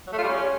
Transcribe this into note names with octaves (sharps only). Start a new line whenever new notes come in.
F#3
A3
F4
G3
C#4